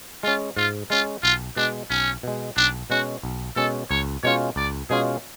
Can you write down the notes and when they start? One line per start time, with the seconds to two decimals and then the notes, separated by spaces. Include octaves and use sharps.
0.23 G#3 C#4 F4
0.57 G#2 F4
0.90 G#3 C#4 F4
1.23 B1 F4
1.56 B2 G#3 D4
1.90 B1 C#4
2.23 B2 G#3
2.57 B1 D4
2.90 B2 G#3 C#4 F#4
3.23 B1
3.56 B2 G#3 C#4 A4
3.90 C#2 C#5
4.24 B2 G#3 C#4 F4 C#5
4.56 C#2 D5
4.90 B2 G#3 C#4 F4 G#4